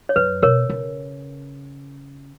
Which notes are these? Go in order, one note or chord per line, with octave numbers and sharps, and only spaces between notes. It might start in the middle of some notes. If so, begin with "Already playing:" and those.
C#5
F#2 B4
B2 A#4 C#5
C#3